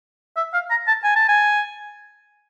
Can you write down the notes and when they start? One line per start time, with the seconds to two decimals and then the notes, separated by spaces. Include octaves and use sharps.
0.36 E5
0.53 F5
0.70 A#5
0.88 A5
1.04 G#5
1.16 A5
1.29 G#5